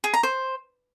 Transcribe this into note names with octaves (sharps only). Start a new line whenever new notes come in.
G#4
A#5
C5